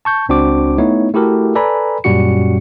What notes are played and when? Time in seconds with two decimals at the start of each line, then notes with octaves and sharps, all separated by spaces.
0.05 A5 C#6 G6
0.29 C#2 C4 D4 F#4 C5 D6
0.78 A3 B3 D#4 E4 C#5
1.14 A3 E4 F#4 G4 A4 A#4
1.55 A4 B4 D5 G#5 A#5 B5
2.04 F#2 A#2 G3 C#4 F#4 C#7